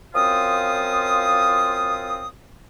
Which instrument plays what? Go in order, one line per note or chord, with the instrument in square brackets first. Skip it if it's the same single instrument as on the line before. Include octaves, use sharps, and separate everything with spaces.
[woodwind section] F#2 F3 C4 F4 D#6